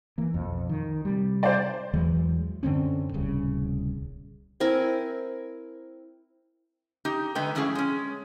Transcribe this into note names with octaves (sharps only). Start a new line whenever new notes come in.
E3 A#3
B1 F2
D#3
C3 G3
C5 D5
E2 E3 F#3 G#3
F#2 D3 C4 C#4
D1 C2 C#3
C4 E4 A#4 G#5
D#4 G4
D3 G#3 B4 G5 A#5
A2 F3 C#4 E4 G#4
G#3 C#4